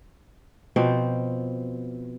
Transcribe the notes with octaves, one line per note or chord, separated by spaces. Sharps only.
B2 F3 C4